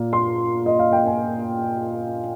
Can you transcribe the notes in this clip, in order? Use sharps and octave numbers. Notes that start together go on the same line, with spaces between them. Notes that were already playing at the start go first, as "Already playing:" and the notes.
Already playing: A#2 A#3
C6
D#5
F5
G5
G#5